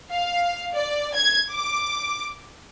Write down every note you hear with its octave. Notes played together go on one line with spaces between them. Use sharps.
F5
D5
G#6
D6